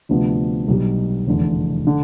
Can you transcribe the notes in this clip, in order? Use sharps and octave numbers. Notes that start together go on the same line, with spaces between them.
D2 C3 F3 B3 D4
B1 B2 G3
F1 E2 D3
D3